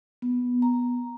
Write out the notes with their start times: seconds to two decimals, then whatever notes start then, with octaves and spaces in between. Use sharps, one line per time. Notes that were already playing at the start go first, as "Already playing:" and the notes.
0.22 B3
0.62 A#5